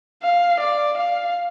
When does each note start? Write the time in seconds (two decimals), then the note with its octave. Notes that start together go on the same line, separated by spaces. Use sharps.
0.23 F5
0.60 D5
0.97 F5